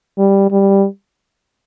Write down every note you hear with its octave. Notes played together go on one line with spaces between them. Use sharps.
G3
G3